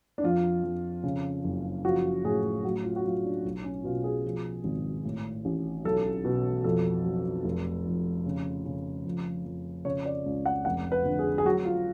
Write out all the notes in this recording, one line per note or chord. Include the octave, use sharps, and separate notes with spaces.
D4
F2 F4
F2
C#3
F#1
F3 F#4
A2 G#4
F#3 F#4
F4
F#4
F#3 F4
D4
B1
C#4
B2 F4
G#4
F3
G#1
A2
A1
B1 A4
B2
F2 A4
F#3
F1
F2
C#3
C#3
F2
F2
C#3 C#5
D5
C#2
F#5
F1 F#5
B4
D3
G#4
G#4
F#3 F#4
F4